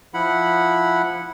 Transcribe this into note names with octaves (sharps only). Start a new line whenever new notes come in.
F3 E4 F#5 B5